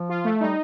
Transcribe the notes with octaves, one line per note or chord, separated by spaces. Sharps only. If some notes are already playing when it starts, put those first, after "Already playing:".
Already playing: F3
F4
A3
G3 D#4